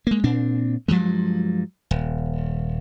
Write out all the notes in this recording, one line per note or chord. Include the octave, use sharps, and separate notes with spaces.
G#3 A#3
A#2 C4 D4
G2 F3 F#3 G#3
D#1